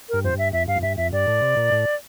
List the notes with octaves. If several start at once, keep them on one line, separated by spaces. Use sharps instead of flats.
G2 A#4
F2 C5
G2 E5
F2 E5
G2 F5
F2
G2 E5
F2 E5
G2 D5
A2
C3
A#2
A2